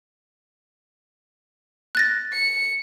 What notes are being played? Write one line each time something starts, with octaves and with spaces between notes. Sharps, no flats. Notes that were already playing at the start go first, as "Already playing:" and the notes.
F#6 A6 A#6
C#7